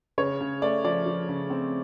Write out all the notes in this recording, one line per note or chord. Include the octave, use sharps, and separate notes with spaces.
C#3 C#5
C#3
A3 D5
F3 D5
F3
C#3
C4